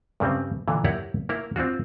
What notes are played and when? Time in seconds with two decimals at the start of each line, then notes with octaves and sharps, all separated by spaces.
0.20 G2 C#3 G3 C4
0.68 A#2 D3 E3
0.84 E4 G4 A#4 C#5 D5 F#5
1.29 A#3 E4 A#4
1.56 C4 D4 F4 F#4